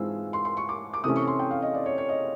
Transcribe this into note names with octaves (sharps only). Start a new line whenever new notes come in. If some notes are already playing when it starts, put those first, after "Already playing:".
Already playing: G#2 E3 G#3 C4 F4 E6
C6
C6
C#6
D6
D6
C3 E3 A3 C#4 D#6
C#6
C6
G5
F5
D#5
D5
C#5
C#5
D#5